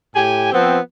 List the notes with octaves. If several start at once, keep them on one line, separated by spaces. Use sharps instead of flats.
A2 G4 G#5
F3 B3 C4